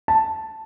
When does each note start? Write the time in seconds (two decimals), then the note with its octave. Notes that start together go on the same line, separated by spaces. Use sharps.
0.08 A5